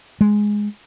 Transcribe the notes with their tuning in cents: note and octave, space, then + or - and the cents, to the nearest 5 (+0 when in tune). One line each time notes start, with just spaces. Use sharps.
G#3 +0